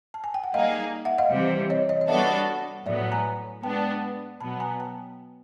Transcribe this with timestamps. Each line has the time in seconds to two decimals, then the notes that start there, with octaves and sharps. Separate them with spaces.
0.14 A5
0.24 G#5
0.34 G5
0.44 F#5
0.54 G3 A#3 D#4 G#4 D#5 F5
1.05 E5 F#5
1.18 D#5 F5
1.31 C3 E3 G3
1.70 C#5 D#5
1.89 C#5 D#5
2.01 D#5
2.08 G3 B3 D4 F#4 A4 D5 E5
2.86 A2 F#3 B3 D5 E5
3.12 G#5 A#5
3.63 G#3 B3 D4 G5 A5
4.40 B2 F#3 B3 A5 B5
4.60 G#5 A#5
4.80 G5 A5